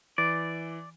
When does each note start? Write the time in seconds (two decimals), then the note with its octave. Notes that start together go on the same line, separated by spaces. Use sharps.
0.18 E3 D5